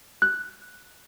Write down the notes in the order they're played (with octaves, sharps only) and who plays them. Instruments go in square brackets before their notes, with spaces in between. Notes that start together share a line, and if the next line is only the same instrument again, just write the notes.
[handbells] F#6